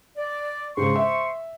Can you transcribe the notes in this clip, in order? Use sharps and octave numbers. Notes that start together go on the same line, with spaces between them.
D5
G#2 C#3 C5 C6 C#6
E5